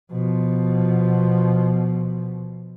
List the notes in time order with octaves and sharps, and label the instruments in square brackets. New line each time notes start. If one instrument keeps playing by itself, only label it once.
[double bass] B2 F3